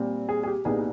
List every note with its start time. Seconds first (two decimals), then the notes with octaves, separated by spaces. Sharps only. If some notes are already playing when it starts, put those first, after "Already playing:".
Already playing: A#2 G3 C4
0.29 G#4
0.43 G#4
0.47 G4
0.65 C2 A#2 G3 B3 D#4 G#4